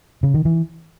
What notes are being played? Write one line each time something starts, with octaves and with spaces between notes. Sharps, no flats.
C#3
D#3
E3